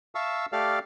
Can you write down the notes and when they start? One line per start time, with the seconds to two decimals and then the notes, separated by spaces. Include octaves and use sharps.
0.15 E5 F5 A5 C#6 E6
0.52 A3 G4 A4 D5 F5 F6